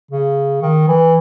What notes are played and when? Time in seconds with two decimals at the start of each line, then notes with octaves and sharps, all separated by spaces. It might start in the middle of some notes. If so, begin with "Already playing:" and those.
0.11 C#3
0.62 D#3
0.88 E3